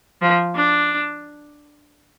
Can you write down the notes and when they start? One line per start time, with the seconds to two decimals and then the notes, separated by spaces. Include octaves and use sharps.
0.22 F3
0.56 D4